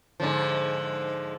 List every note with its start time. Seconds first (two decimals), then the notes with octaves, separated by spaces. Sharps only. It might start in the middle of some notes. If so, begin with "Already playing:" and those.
0.20 G#2 D3 F3